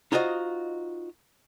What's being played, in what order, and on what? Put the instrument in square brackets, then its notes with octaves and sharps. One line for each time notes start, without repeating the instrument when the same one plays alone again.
[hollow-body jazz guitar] D#4 F4 F#4 C5 D#5